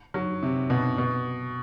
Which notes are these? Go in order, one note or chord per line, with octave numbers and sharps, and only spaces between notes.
F#3
C3
B2
B2